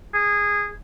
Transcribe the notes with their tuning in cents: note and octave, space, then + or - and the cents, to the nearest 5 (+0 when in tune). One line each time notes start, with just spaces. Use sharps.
G#4 -15